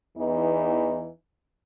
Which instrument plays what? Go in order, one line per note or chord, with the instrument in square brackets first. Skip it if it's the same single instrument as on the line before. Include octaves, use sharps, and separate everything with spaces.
[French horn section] E2 E3 B3 D#4